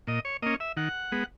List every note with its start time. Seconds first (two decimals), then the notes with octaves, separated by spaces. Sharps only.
0.07 A#2 D#5
0.25 C#5
0.42 A#3 C#4 D#5
0.60 E5
0.77 D#3 F#5
1.12 G#3 B3